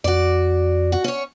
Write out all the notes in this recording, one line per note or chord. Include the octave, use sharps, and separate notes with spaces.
F2 F#4 D5
F#4
C#4 C#5